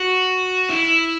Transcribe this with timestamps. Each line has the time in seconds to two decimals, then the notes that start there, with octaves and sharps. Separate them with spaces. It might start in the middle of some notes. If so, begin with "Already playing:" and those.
Already playing: F#4
0.69 E4